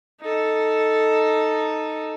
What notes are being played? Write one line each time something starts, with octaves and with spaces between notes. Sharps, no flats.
D#4 A4